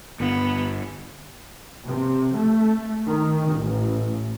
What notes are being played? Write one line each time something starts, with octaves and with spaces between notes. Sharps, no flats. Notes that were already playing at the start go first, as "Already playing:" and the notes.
G1 B3
C3
A3
D#3
A1